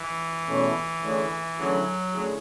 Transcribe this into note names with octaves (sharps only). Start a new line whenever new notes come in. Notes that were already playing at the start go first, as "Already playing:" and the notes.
Already playing: E3
E2 B2 A3 C#4 E4
D3 A3 C#4 E4 G#4
D3 F#3 A3 C#4 E4 G#4
D3 A3 C#4 E4 G#4